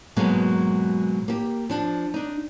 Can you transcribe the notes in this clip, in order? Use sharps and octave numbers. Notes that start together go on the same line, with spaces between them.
G#2 B2 F#3 G#3 A#3
A#3 G4
F3 D4
D4 D#4